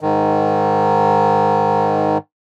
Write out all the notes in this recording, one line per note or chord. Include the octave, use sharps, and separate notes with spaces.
G#2 D#3